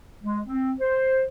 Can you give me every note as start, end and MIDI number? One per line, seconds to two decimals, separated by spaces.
0.23 0.40 56
0.47 0.72 60
0.80 1.25 72